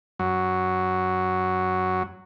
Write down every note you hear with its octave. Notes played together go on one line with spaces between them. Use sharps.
F#2 F#3